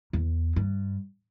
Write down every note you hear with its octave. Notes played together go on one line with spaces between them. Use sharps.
E2
G2